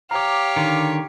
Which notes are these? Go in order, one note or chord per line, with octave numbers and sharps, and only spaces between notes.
G4 C#5 F5 A#5 D6
D3 D#3